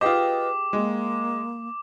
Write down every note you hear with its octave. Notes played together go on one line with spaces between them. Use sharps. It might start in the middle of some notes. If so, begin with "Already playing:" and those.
F4 G4 G#4 B4 D#5 G5 D6
G#3 A#3